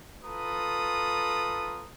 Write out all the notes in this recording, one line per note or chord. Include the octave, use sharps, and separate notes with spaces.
F4 A4 B4 A#5 D#6